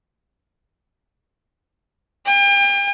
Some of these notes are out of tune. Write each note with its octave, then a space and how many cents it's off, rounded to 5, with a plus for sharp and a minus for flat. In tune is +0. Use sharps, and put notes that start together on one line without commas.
G5 +40